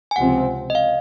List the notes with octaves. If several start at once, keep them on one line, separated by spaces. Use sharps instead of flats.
G#5
C#2 C3 F3 C4 F#5
D#5
F5